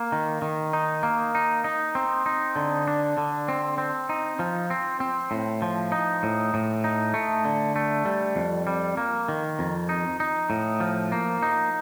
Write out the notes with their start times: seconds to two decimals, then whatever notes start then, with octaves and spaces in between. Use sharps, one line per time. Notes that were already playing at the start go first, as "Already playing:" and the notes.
Already playing: A#3
0.12 D#3
0.42 D#3
0.73 D#4
1.03 A#3
1.35 D#4
1.64 D#4
1.95 C4
2.26 D#4
2.56 D3
2.87 D4
3.18 D3
3.48 C4
3.78 C4
4.09 D#4
4.39 F3
4.70 C4
5.00 C4
5.31 A2
5.62 F3
5.92 D#4
6.23 A2
6.54 A2
6.84 D#4
7.14 A3
7.45 D3
7.76 A3
8.05 G3
8.36 F2
8.67 G3
8.97 A#3
9.29 D#3
9.59 F2
9.89 D#4
10.20 D#4
10.50 A2
10.80 F3
11.12 A#3
11.43 D#4